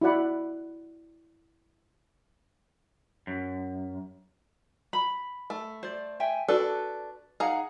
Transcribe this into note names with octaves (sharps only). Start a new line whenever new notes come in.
E4 F#4 D5 F#5 B5
F#2
B5
A3
C5 D5
E5 G5 G#5
D4 F#4 A4 B4 D5
D#4 G#4 F5 F#5 A#5